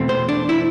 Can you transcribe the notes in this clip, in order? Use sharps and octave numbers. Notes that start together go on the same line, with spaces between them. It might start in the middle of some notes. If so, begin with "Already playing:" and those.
Already playing: E2 B2 A3 C4
C5
D4
E4